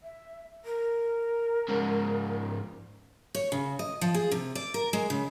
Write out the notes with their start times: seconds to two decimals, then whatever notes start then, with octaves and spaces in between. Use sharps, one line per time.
0.03 E5
0.65 A#4
1.68 G#2 C#3
3.35 C#5
3.52 C#3
3.79 D#5
4.01 F3
4.14 G#4
4.31 C3
4.55 D5
4.74 A#4
4.93 G#3
5.10 C#3